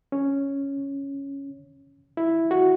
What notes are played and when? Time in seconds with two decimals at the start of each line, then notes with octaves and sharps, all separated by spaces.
0.12 C#4
2.17 E4
2.51 F#4